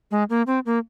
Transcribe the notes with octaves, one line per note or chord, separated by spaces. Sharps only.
G#3
A#3
C4
A#3